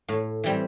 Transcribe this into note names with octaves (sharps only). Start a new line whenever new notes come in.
A2
E3 G3 C4